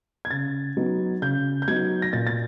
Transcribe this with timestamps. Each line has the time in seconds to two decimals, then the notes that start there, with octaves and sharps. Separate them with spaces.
0.25 G#6
0.31 C#3 A6
0.77 F#3 B3 D#4
1.22 C#3 G6
1.62 G6
1.68 F#3 B3 D#4 G#6
2.02 A#6
2.13 A#2 A6
2.27 A6